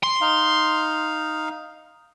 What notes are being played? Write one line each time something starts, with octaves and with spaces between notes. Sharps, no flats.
C6
D#4 F5